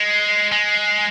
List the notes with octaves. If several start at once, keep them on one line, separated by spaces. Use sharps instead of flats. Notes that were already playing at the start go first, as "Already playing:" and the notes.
Already playing: G#3
G#3